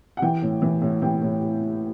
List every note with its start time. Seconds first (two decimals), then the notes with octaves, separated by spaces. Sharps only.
0.17 F#5
0.22 E3 G5
0.42 A2
0.62 E3
0.82 A2
1.02 E3 G5
1.22 A2